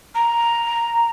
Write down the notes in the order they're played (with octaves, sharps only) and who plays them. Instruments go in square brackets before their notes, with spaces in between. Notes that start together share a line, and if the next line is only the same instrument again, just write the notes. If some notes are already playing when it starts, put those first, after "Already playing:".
[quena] A#5